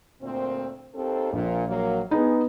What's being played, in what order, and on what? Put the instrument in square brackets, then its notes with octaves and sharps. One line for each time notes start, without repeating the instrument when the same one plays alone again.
[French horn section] D2 A#2 C4
D#2 C4 A4
[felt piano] A#1 [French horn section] A#2 F3
[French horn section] F#3 A#3
[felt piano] B3 D#4 [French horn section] G#4